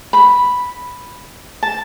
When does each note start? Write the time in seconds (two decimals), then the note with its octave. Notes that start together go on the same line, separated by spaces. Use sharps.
0.13 B5
1.63 A5